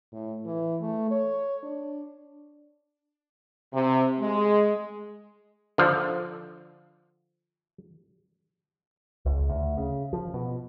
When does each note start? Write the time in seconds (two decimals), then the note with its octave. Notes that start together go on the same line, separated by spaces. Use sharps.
0.12 A2
0.46 E3
0.81 A3
1.11 C#5
1.63 D4
3.74 C3
4.20 G#3
5.78 D3 F3
9.25 C#2
9.49 D2
9.78 C#3
10.13 F3
10.34 B2